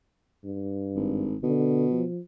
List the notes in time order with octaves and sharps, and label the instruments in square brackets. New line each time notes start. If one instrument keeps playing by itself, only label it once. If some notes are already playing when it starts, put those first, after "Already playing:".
[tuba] G2
[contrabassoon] G#1
[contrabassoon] B2 [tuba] D3
[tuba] F3